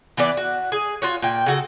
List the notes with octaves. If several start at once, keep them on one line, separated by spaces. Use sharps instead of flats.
E3 B3 B4 D5
F#4
G#4
F4 F#4 C#5
A#2 G5
C#3 F#4 A4